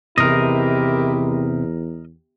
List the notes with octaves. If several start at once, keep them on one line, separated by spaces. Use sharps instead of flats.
E2 C3 D#3 E4 G4 A#4 D#5